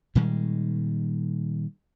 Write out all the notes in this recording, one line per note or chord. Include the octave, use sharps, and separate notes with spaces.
A#2 D#3 G3 G#3